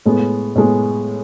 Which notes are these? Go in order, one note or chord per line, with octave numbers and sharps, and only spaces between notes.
A2 G#3 B3
A2 G#3 B3